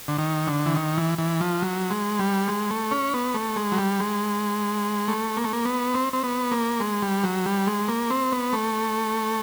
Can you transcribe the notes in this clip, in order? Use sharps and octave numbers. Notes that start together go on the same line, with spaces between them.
D3
D#3
D3
E3
D#3
E3
E3
F3
F#3
G#3
G3
G#3
A3
C#4
B3
A3
G#3
F#3
G3
G#3
A3
A#3
A3
A#3
B3
C4
C4
B3
A#3
G#3
G3
F#3
G3
G#3
A#3
C4
B3
A3